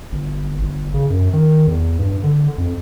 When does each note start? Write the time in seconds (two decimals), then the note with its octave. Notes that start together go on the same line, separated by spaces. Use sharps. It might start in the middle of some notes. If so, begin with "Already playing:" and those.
0.12 G1
0.62 G1
0.94 C#3
1.10 F#2
1.33 D#3
1.67 E2
1.99 G2
2.24 D3
2.58 F2